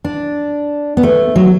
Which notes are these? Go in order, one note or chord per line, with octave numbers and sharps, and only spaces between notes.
D4
B3
A3
F#3